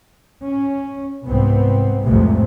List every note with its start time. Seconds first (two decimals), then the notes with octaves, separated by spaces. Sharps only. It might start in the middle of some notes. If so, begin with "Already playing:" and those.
0.46 C#4
1.25 C2 G#2 B3 C4
2.04 C2 F2 A2 C3 G#3 A3